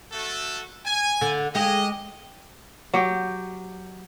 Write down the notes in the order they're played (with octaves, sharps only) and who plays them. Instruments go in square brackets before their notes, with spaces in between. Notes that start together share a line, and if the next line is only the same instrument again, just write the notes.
[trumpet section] A3 F#4 A4
G#5
[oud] D3
[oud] G#3 G4 [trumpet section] D#5
[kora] F#3 G4